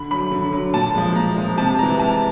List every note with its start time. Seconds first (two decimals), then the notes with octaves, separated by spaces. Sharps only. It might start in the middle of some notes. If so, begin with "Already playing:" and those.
Already playing: D3 B5
0.11 F#3 B5
0.31 D3
0.53 F#3
0.74 A#2 A5
0.95 F3 G#3
1.16 A#2 A#5
1.36 F3 G#3
1.58 C3 A5
1.78 E3 G#3 A#5
1.99 C3 A5